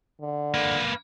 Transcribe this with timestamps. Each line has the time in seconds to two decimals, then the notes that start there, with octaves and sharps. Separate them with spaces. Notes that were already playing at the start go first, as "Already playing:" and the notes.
0.21 D3
0.54 A#3 B4